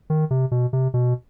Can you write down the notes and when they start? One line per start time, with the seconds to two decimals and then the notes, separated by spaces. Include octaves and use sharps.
0.10 D#3
0.31 C3
0.51 B2
0.73 C3
0.94 B2